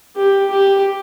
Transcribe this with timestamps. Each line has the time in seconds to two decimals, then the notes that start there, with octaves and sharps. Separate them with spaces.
0.17 G4
0.51 G4